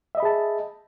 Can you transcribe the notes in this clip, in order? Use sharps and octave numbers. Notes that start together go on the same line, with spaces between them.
G#4 D#5 E5 A5 B5